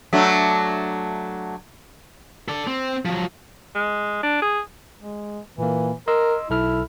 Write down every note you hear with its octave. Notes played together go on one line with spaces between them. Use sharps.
F#3 A3 D4
A4 D5
C4
F3 F#3
G#3
D4
G#4
G#3
A#2 E3 A#3
A#4 D#5 C6 E6
B1 E4 A4 F6